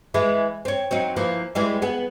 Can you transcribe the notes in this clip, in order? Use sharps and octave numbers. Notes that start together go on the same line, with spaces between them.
E3 G#3 E4
C4 C#5
F#3 C4 D#4
E3 F3 A#3
E3 G3 G#3
B3 G#4